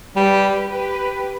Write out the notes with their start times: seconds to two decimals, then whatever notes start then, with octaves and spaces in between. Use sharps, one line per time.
0.16 G3 G4 B4
0.69 G4 B4